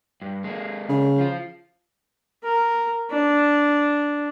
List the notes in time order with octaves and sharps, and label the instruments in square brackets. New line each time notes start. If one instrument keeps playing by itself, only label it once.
[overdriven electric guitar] G2
G#3 A#3
[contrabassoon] C#3
[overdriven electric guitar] F3 F4
[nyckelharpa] A#4
D4